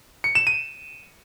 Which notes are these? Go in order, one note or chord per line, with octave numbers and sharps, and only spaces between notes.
C#7
E7
D#7